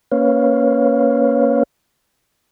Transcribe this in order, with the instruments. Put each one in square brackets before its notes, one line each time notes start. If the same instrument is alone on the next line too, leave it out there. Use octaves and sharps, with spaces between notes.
[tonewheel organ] A#3 C#4 B4 C#5 F5